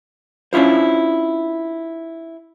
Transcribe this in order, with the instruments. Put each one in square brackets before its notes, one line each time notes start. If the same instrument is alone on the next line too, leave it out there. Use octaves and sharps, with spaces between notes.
[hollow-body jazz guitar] C#4 D4 E4 F4 C5